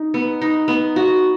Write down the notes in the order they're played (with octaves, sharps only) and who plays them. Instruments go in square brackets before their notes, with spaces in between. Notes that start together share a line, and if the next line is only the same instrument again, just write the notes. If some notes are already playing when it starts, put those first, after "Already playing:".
Already playing: [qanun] D#4
B3
D#4
B3
F#4